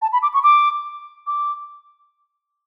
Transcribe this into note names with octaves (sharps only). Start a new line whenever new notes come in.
A5
B5
D6
C#6
D6
D6